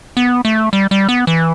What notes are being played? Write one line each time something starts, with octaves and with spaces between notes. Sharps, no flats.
B3
A3
G3
G3
B3
E3